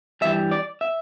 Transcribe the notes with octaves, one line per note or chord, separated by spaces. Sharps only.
G2 E3 G3 E5
D5
E5